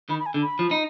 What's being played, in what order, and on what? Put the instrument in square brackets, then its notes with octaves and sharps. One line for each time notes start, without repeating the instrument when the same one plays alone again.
[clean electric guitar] D#3 [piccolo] B5
[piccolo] B5
G#5
[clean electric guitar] D3
[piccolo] B5
[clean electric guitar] F3
D#4